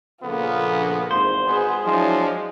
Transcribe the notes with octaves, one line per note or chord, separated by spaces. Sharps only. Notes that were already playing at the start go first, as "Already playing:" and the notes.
A#1 C#3 A#3 B3 F4 A4
G#1 E2 G#2 C5
B3 G#4
F3 F#3 G#3 D4 E4